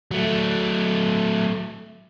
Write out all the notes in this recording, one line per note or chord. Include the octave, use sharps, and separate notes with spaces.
F#3 A3